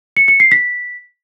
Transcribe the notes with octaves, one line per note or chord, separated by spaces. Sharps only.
C#7
C#7
C7
B6